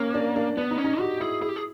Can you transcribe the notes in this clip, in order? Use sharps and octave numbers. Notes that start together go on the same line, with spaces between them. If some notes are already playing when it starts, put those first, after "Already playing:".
Already playing: A#3 C#4
D4
D4
B3 D4
D#4
C#4
D#4
F#4 G4
E4 G#4
E4 G#4
G4
G#4